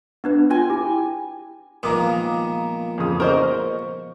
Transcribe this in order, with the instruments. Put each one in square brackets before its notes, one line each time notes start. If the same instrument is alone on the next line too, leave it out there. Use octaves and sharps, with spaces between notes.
[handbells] B3 D4 B4
[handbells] F4 [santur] G5 G#5
[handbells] E4 G4
[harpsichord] A#2 D#3 [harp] F3 G#3 B3 [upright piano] A#5 D6 D#6
[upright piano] F2 C#3 D#6
[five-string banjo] A#4 C5 D#5 [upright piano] C#6